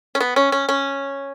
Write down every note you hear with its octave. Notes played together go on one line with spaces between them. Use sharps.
C#4
B3
C#4
C#4
C#4